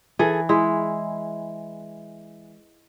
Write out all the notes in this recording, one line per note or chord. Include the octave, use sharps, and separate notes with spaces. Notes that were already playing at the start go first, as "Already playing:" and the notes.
E3 G#4 A4
G#3 E4